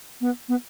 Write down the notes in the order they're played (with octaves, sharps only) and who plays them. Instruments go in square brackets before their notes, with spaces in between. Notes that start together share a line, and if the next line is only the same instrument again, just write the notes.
[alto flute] B3
B3